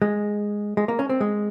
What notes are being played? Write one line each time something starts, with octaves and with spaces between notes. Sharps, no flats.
G#3
G#3
A#3
C#4
C4
G#3